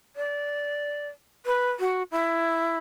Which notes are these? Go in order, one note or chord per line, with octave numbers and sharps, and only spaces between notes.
D5
B4
F#4
E4